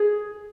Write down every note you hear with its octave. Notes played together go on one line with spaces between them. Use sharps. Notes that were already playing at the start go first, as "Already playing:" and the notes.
Already playing: G#4